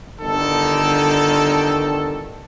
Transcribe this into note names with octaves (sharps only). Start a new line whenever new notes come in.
G1 D3 D#3 A4